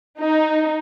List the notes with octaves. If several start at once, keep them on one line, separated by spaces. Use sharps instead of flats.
D#4